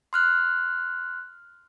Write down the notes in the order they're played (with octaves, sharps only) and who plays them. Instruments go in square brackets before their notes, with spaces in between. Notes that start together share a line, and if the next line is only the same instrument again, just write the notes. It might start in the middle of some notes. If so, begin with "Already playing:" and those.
[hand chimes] C6 F6 F#6